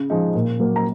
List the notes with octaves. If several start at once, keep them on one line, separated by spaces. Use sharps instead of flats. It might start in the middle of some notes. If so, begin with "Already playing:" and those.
Already playing: C#3
F3 G#3 D#4
A#2
F#3 A#3
A#5